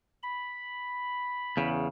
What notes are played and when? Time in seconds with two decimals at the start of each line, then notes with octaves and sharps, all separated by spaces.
0.23 B5
1.57 E2 C#3